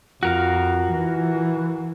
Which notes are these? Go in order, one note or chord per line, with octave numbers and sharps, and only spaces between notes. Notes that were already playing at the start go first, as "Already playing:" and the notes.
F2 F4 F#4 A#4 F5
E3